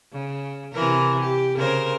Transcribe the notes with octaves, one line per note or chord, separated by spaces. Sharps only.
C#3
C3 E3 A#4
G4
C#3 A#4 C5